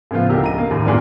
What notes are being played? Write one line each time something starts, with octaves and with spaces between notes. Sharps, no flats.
A2 C#3 F3 B3 F4
C#2 D3 D4 G4 A#4 E6
C#2 A#5 D#7
A#3
D#2 A2
A#2 G3 G#3 B3 D4 A#4